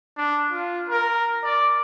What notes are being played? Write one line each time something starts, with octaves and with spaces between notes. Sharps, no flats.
D4
F4
A#4
D5